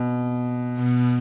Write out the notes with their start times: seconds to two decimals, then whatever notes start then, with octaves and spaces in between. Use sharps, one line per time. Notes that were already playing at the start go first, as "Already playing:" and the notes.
Already playing: B2
0.78 B2